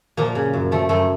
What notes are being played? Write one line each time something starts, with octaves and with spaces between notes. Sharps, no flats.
A#2 F3 A#3
C#3
F#2
F3 A3
F#2 A3